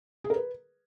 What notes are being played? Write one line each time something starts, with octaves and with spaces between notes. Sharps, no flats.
G#4
A#4
B4